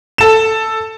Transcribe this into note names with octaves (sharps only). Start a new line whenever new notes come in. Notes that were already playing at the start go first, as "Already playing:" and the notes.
A4 E7